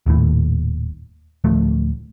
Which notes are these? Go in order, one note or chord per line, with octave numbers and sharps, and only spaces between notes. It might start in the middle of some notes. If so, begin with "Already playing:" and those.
D#1 D#2 A2
D1 F3 A3